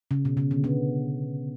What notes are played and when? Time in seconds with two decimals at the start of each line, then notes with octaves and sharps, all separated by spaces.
0.11 C#3
0.25 B2
0.37 C#3
0.51 D3
0.64 B3